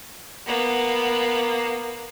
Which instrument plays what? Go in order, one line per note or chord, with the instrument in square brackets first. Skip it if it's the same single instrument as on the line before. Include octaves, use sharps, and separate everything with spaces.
[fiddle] A#3 B3